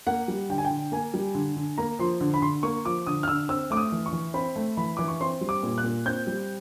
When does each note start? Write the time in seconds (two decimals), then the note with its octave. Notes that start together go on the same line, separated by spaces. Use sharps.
0.07 A#3 F#5
0.28 G3
0.49 D3 G5
0.58 G#5
0.65 G5
0.71 D3
0.92 A#3 G#5
1.14 G3
1.35 D3
1.56 D3
1.78 A#3 A#5
1.99 F3 C6
2.21 D3
2.34 B5
2.42 D3 C6
2.63 A#3 C#6
2.85 F3 D6
3.06 D3 D#6
3.23 F6
3.28 D3 E6
3.49 C4 E6
3.71 A3 D6
3.77 D#6
3.92 E3
4.06 C#6
4.13 E3
4.34 C4 B5
4.56 A3
4.77 E3 B5
4.97 E3 D6
5.08 C#6
5.21 C4 C6
5.41 G3
5.49 D6
5.63 A#2
5.78 F#6
5.84 A#2
6.06 C4 G6
6.27 G3